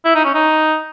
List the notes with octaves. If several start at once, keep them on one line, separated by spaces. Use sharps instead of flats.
E4
D#4
C#4
D#4